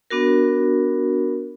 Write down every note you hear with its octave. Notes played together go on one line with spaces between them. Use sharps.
B3 D4 F#4 A#4